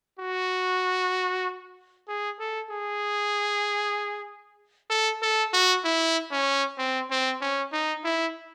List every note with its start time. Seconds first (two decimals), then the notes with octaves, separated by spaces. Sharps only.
0.19 F#4
2.08 G#4
2.40 A4
2.71 G#4
4.90 A4
5.22 A4
5.54 F#4
5.85 E4
6.31 C#4
6.78 C4
7.11 C4
7.41 C#4
7.73 D#4
8.05 E4